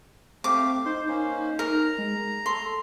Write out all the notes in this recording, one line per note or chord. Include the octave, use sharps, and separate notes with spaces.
A3 C4 G4 F5 D6
D#4 C5 C6
A#3 C#4 D#4 C5
A#4 A#5
G#3
A4 C6